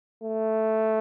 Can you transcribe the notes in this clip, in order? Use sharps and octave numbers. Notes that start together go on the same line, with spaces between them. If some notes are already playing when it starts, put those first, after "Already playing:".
A3